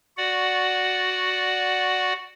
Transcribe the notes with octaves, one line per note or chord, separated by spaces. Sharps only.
F#4 D5 F#5